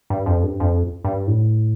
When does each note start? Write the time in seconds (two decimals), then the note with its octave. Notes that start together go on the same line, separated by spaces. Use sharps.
0.10 G2
0.26 F2
0.43 G2
0.60 F2
1.04 G2
1.27 A2